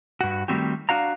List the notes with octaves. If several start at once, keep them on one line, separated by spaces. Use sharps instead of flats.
G2 F#4
D#3 G3 A3 C4 F#4 G4
D4 F#4 F5 A#5